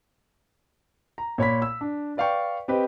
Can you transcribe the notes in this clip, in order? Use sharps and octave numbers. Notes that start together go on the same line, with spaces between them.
A#5
A#2 C#5 B5 B6
E6
D4
B4 D5 F5 G5 C#6
C4 G4 B4 D#5